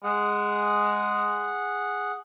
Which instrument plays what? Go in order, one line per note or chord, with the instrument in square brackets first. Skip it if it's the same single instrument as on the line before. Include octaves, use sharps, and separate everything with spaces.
[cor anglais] G#3 [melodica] G#4 F#5